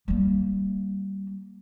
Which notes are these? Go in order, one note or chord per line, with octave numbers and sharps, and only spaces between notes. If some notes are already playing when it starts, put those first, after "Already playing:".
G3 A#3